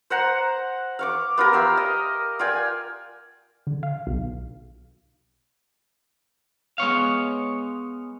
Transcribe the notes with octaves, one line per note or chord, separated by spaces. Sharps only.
C5 F#5 A#5
F5 C#6 D6
B3 F4 G4 A#4
E5 F5 G5 C6
D#5
F4 D5 G5 G#5
D3
F5
B1
G#3 B3 C#5 F5